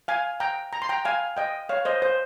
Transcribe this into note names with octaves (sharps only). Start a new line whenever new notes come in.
F5 G#5
G5 A#5
A#5
C6
G5 A#5
F5 G#5
D#5 G5
C#5 F5
C5 D#5
C5